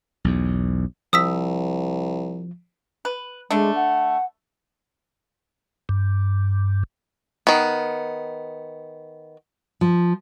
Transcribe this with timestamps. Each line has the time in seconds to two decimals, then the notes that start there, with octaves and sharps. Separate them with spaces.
0.24 B1 E2
1.13 C2 F3 D#6 E6 B6
3.05 B4
3.50 D3 G#3 A3 D4
3.75 F#5
5.89 G2
7.47 D#3 B3
9.81 F3